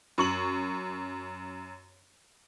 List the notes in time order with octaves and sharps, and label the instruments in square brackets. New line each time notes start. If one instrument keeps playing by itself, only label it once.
[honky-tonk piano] F#2 C#6 F#7